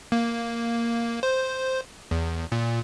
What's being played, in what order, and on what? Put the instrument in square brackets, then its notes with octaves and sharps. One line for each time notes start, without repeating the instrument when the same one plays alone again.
[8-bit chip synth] A#3
C5
E2
A#2